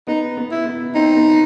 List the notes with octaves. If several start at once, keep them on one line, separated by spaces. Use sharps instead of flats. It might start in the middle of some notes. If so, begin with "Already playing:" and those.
B3 D#4
B3
E4
B3
C4 D#4
B3